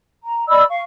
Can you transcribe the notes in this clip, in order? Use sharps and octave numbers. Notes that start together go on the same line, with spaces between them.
A#5
D5 D#5 B5 E6
F5 C#6